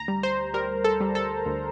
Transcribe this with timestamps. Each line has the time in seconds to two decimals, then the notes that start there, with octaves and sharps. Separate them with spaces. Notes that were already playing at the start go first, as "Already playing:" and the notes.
Already playing: D2 A#5
0.08 G3
0.23 C5
0.54 G3 A#4
0.84 A4
1.00 G3
1.15 A4
1.46 D2